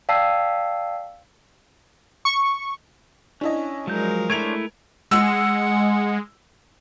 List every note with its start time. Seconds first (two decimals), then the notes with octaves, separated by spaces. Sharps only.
0.09 D5 F5 G5 A5 E6 C7
2.25 C#6
3.41 C#4 D4 E4 D#5
3.87 F3 F#3 G#3 A#4 G6
4.30 A3 D4 E4 C5 C#5 G#6 D7 F7
5.11 G#3 F#5 E6